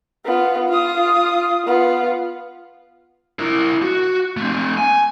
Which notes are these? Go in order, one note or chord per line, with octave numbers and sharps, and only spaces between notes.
B3 F4
F4 D#6
B3 F4
E4 A#4
F#4
A3 C4
G#5